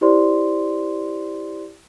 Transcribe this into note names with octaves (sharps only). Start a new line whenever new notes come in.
E4 G4 C5 D5 C6